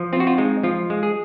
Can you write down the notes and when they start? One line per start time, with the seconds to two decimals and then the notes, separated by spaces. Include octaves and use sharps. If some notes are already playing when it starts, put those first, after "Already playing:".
Already playing: F3
0.13 C4 F4
0.20 F#4
0.27 F4
0.38 G#3 D#4
0.63 F3 F4
0.90 G#3
1.03 G#4